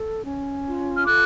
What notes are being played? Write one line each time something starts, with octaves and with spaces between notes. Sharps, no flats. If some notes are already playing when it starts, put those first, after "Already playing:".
Already playing: A4
C#4
F4
F6
A4 D6 F#6